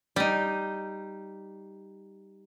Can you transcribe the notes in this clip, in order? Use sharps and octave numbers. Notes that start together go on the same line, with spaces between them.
G3 D#4